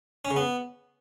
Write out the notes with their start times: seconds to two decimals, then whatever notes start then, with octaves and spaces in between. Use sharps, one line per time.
0.25 C#4
0.31 C#3
0.36 B3